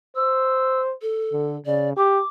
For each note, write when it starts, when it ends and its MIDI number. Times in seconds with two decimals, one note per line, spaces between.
0.16 0.93 72
0.16 0.81 88
1.02 1.55 69
1.32 1.57 50
1.66 1.94 49
1.66 1.90 74
1.97 2.20 67
1.97 2.29 86